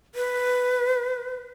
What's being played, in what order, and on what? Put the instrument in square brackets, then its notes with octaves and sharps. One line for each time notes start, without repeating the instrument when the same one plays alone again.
[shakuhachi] B4